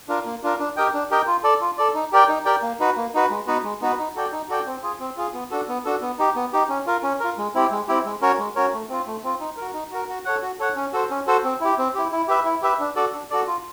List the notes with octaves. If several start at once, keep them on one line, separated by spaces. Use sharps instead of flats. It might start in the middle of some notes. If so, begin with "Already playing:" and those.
D4 F4 A#4
A#3
D4 F4 A#4
D4
G4 A#4 D#5 G5
D4
G4 A#4 D#5 G5
F4
A4 D5
F4
A4 D5
D#4
G4 A#4 D5 G5
D#4
G4 A#4 D5 G5
A#3
D#4 F#4 B4
A#3
D#4 F#4 B4
G#3
B3 D#4 F#4 B4
G#3
B3 D#4 F#4 B4
D#4
F#4 A4 D5 G5
D#4
F#4 A4 D5 G5
C4
F4 G#4
C4
F4 G#4
B3
D4 F#4 A4
B3
D4 F#4 A4
B3
D#4 G4
B3
D#4 G4
C#4
F4 A#4
C#4
F4 A#4
G#3
C4 E4 G4
G#3
C4 E4 G4
G#3
C#4 F#4 A#4 C#5
G#3
C#4 F#4 A#4 C#5
A3
C4 F4
A3
C4 F4
D#4
F#4 A#4
D#4
F#4 A#4
F#4
A4 C#5 F#5
F#4
A4 C#5 F#5
C#4
F#4 A4 C5
C#4
F#4 A4 C5
C4
E4 G4
C4
E4 G4
E4
G4 B4 E5
E4
G4 B4 E5
D4
F#4 A4 D5
D4
F#4 A4 D5
F4